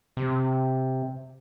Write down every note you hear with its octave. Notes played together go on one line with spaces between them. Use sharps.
C3